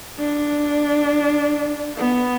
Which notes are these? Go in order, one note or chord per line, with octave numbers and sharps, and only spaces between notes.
D4
B3